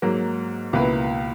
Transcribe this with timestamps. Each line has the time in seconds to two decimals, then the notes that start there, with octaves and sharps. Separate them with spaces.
0.02 G#2 F#3 A#3
0.73 C#2 B2 A#3 E4 B4